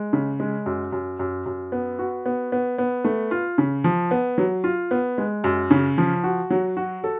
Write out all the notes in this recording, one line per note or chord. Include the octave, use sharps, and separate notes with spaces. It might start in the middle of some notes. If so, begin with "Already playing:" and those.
Already playing: G#3
C#3
G#3
F#2
F#2
F#2
F#2
B3
F#4
B3
B3
B3
A3
F4
C#3
F3
B3
F#3
F4
B3
G#3
F#2
C#3
F3
F#4
F#3
F#4
A4